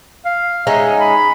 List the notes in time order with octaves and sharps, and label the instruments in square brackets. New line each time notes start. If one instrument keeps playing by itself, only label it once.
[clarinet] F5
[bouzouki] G#3 C#4 D#4 [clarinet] E5
[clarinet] B5